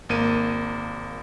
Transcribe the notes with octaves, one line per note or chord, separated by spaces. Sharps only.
G#1 A#3 D#7